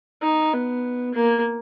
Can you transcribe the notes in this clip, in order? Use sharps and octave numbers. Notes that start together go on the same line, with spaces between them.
D#4
B3
A#3